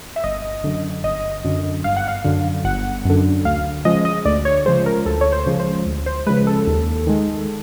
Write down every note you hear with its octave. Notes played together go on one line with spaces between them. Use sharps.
E5
G1 D#5
F#2 D3
G1 D#5
F#2 D3
G1 F5
F#5
F5
F#2 D3
G1 F#5
F#2 D3
D2 F5
C#3 F3 G#3 D#5
D#5
D2 D5
C#5
C#3 F3 G#3 C5
A#4
D2 A4
C#5
C5
C#3 F3 G#3
C5
D2
C5
C#3 F3 G#3 B4
A4
D#2
D#3 G#3